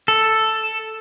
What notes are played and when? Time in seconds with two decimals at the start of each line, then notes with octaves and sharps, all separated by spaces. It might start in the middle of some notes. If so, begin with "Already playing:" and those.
0.08 A4